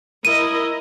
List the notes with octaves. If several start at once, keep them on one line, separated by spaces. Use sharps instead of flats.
E4 A#4 D#5 D#7